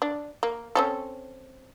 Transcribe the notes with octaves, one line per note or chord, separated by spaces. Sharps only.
D4
A#3
C4 C#4 A4